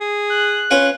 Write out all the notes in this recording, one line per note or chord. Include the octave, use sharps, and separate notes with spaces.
G#4
F#6
C#4 F4 B4